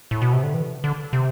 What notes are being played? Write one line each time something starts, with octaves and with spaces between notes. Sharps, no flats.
A2
B2
C3
D3
E3
D3
C3